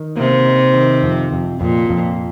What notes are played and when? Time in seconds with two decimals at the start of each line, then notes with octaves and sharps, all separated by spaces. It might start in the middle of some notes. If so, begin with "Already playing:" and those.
Already playing: D#3
0.17 C3 A#3
0.45 D#4
0.74 D#3
1.03 F2
1.33 F2
1.61 F2 A#2
1.90 F2